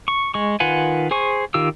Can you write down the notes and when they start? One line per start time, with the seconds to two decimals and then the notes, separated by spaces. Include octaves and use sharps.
0.08 C#6
0.34 G#3 C#6
0.60 D#3 F4 B4 F#5 G#5
1.11 G#4 C5 G#5 C#6
1.54 D#3 F4 G4 E6